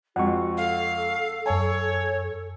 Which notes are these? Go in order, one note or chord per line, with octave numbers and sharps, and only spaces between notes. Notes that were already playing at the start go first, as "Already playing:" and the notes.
F2 G#3 F#4 F#5 C#6
A4 F5
F#2 C#5 G#5 A5